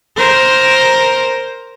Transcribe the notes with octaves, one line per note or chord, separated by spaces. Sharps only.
A#4 C5